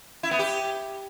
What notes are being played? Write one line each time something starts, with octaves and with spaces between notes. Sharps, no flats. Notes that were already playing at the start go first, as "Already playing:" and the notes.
E4
B3
G4